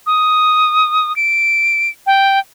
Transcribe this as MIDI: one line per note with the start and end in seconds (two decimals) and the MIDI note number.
0.06 1.15 87
1.16 1.89 98
2.06 2.39 79